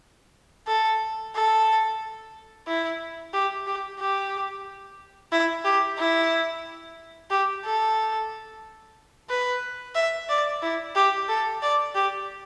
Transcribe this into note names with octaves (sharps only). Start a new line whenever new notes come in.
A4
A4
E4
G4
G4
G4
E4
G4
E4
G4
A4
B4
E5
D5
E4
G4
A4
D5
G4